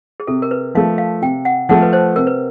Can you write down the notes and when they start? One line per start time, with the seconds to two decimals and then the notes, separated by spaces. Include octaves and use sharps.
0.20 G#4
0.27 C3 A4
0.42 A#4
0.51 B4
0.75 F3 A3 F5
0.98 F5
1.22 C3 G5
1.45 F#5
1.69 F3 A3 F#5
1.82 B4
1.93 C5
2.16 C3 A#4
2.27 B4